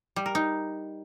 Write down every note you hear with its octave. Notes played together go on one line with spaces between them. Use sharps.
G3
A#4
D#4